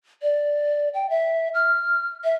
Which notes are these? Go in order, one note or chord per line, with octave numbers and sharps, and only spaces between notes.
D5
G5
E5
F6
E5